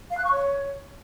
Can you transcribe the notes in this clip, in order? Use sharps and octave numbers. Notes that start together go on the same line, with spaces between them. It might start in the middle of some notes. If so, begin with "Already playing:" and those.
F5
F#6
C#6
C#5